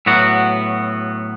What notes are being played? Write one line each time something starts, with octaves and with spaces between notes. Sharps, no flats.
A2 F#3 B3 F#4